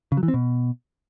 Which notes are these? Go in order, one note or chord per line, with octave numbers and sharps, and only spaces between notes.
C#3
F#3
E3
C4
B2